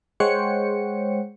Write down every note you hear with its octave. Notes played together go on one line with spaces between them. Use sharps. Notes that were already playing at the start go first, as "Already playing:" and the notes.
G#3 C5 C#5 F#5 G5 C#7